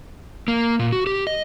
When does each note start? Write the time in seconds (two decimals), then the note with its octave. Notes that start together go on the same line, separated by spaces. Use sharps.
0.48 A#3
0.79 A#2
0.92 F#4
1.07 G4
1.27 D#5